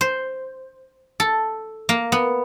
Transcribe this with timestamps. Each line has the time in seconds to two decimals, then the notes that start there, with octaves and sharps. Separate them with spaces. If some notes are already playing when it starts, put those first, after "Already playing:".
0.01 C5
1.20 A4
1.89 A#3
2.12 B3